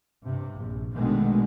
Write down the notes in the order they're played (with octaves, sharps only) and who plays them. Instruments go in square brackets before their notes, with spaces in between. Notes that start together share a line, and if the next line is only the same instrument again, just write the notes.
[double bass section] G2 C3
A#1
B2 D3 D#3 G#3 A3